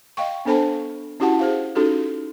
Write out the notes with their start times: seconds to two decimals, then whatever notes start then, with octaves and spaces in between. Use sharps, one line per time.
0.17 D#5 F5 G5 C#6
0.45 B3 D4 A4 C5 A5 B5
1.20 C#4 E4 F#4 G4 F#5 A5
1.39 G#4 C5 F5
1.75 C#4 D#4 F#4 G4 A4